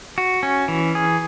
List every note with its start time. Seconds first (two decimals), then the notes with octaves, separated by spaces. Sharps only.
0.18 F#4
0.43 C#4
0.68 E3
0.95 G#4